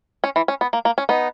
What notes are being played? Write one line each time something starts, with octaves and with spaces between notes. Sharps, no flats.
C#4
E3
C#4
B3
A#3
A#3
C#4
B3 D#4